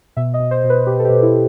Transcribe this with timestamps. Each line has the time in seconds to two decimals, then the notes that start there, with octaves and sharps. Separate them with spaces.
0.17 B2 E5
0.34 D#5
0.40 B2
0.51 C5
0.64 B2
0.70 B4
0.87 B2 G4
0.99 A4
1.05 G4
1.10 B2
1.22 E4